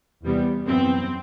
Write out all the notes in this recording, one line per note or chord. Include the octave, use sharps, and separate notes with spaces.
E2 C3 G3 B3
F#2 E3 B3 C4